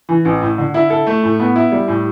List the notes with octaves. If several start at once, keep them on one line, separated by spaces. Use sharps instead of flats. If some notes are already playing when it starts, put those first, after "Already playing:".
E3
A1
A2
D3
E4
A4
A3
A2
B3
E4
G3
A2